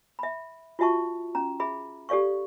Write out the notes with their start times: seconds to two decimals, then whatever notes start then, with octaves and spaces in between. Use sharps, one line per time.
0.19 E5 B5
0.79 F4 F#4 E5 A5 C#6
1.35 C#4 A#5
1.60 G#4 E5 B5
2.09 G4 A4 D5 F5 C#6